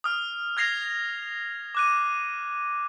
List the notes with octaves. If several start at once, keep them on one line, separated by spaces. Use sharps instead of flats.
D#6 F6
F6 G#6 A#6 C7 F7
D6 F#6 D#7